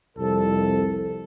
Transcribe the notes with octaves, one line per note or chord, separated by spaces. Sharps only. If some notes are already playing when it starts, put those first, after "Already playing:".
C2 F2 A4